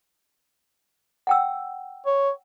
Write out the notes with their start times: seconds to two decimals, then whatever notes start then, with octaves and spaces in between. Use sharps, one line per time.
1.27 F#5 G5 E6
2.06 C#5